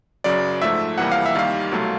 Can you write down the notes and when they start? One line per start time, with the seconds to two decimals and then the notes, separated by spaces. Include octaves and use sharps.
0.24 F#2 C#3 F#3 D5
0.62 G#2 F3 A3 E5
0.98 F2 C3 E3 G3 A#3 F#5
1.12 F5
1.26 E5
1.35 D#2 D#3 G3 A#3 F5
1.72 C2 B2 F#3 A3